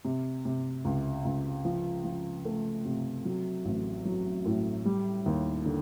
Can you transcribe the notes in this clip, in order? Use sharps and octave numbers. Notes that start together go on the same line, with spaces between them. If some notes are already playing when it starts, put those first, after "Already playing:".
C3
C3
C#2
C#2
F3
F3
A3
C3
F#3
A1
F#3
A2
G3
D#2
D3